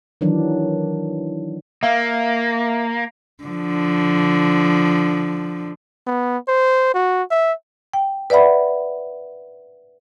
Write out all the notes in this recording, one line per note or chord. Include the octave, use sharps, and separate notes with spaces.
D#3 E3 F#3 D4
A#3 E5 F5
D3 F3
B3
C5
F#4
E5
G5
B4 D5 E5 F#5 B5